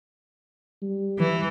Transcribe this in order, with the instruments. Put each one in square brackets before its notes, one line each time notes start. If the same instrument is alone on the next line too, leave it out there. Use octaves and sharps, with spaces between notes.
[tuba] G3
[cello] E3